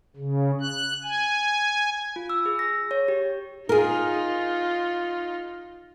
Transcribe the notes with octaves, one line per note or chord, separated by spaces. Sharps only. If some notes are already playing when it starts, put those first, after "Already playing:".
C#3
F#6
G#5
F4
E6
G#4
A#6
C#5
G4
D#4 F4 G#4 A#4